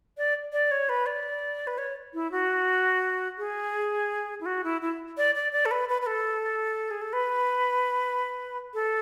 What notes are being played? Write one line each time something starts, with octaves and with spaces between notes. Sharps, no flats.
D5
D5
C#5
B4
D5
B4
C#5
E4
F#4
G#4
E4
F#4
E4
E4
D5
D5
D5
A4
B4
B4
B4
A4
G#4
A4
B4
A4